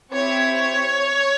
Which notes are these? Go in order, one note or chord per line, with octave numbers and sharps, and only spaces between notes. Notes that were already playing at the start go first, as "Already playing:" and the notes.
C4 E4 G4 C#5